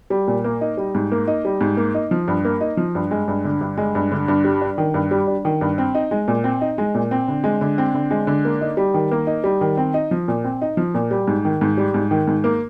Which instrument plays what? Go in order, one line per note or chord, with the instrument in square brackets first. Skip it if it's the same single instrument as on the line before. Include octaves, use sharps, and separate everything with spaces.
[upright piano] G3
A#2
A#3
D#4
G3
G#2
A#3
D#4
G3
G#2
A#3
D#4
F3
G2
A#3
D#4
F3
G2
G#3
G2
D3
G2
G#3
G2
D3
G2
G3
D4
D#3
G2
G3
D4
D#3
G2
C4
D#4
G#3
A#2
C4
D#4
G#3
A#2
C4
D3
G#3
D3
C4
D3
G#3
D3
A#3
D#4
G3
D#3
A#3
D#4
G3
D#3
C4
D#4
F3
A#2
C4
D#4
F3
A#2
G3
G#2
D#3
G#2
G3
G#2
D#3
G#2
A#3